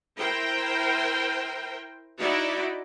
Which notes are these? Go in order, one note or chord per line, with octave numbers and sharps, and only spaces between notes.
E4 A#4 C5 G5
D#4 E4 F#4 D5